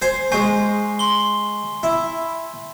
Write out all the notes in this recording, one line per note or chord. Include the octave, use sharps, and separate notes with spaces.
C5 G#5 C6
G#3 C5 G#5 C#6 C7
C6 G7
E4